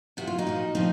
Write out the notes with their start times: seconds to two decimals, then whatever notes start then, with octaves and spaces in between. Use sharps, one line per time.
0.17 C3 F3 F#4
0.27 F4
0.39 D#4 F#4
0.47 A#2 F3
0.75 A#2 F3 C4 D#4